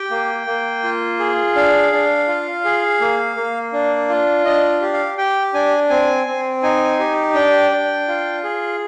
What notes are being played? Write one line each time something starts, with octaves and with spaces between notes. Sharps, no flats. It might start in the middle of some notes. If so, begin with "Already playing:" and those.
Already playing: G4 G5
A#3
A#3
F4
G#4
D4 F5
D4
F4
G#4
A#3
A#3
D4
F4
D4 D#5
G4
F5
G4 G5
D4 G#5
C4 G#5
C4
D#4 G#5
G4
D4 G5
D4
F4
G#4